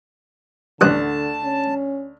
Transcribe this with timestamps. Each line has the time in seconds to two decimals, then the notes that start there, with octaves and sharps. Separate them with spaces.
0.81 A1 D2 G2 D3 A5 D#6 F#6
1.44 C#4